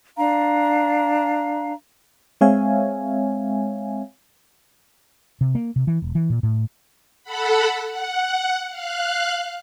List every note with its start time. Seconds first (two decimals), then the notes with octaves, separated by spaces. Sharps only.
0.17 D4 F5 A#5
2.41 G#3 C4 C#5 E5 F5 G#5
5.41 C3
5.55 A#3
5.76 C3
5.87 E3
6.02 E1
6.15 E3
6.30 A#2
6.43 A2
7.23 A4 F#5 B5
7.90 F#5
8.70 F5 F#6